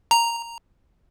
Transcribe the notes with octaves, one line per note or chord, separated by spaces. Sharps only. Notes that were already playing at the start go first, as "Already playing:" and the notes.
A#5